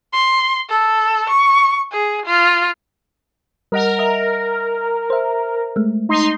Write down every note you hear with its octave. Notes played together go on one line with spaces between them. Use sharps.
C6
A4
C#6
G#4
F4
G3 A#4 D#5 F#5
D#5 E5 A#5
C5 E5
G#3 A3
D#4 C6